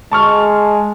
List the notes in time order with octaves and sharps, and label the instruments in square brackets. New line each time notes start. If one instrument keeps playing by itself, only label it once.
[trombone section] G#3 [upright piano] A5 C#6 F6